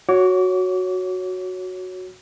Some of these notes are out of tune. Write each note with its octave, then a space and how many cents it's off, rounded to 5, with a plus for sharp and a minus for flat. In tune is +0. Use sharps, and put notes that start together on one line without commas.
F#4 -5 C#5 +0 D6 -30